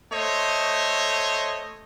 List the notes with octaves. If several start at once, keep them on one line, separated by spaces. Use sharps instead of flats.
A3 C5 C#5 D#5